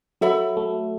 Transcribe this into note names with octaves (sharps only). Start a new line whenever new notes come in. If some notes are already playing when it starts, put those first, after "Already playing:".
F#3 A4 E5 B5
A3